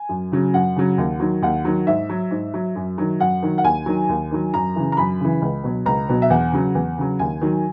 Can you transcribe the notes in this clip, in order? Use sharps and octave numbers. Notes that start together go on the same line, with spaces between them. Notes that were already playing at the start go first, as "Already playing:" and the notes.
Already playing: G#5
F#2
C#3 F#3
F#2 F#5
C#3 F#3
D#2
D#3 F#3
D#2 F#5
D#3 F#3
G#2 E5
F#3
G#2
F#3
F#2
D#3 F#3
F#2 F#5
D#3 F#3
F#5
D#2 G#5
D#3 F#3
D#2
D#3 F#3
F#2 A#5
C#3 E3
A#5
F#2 B5
C#3 E3
C#2
B2 F#3
C#2 A#5
B2 F#3
E5
E2 F#5
C#3 F#3
E2
C#3 F#3
D#2 G#5
D#3 F#3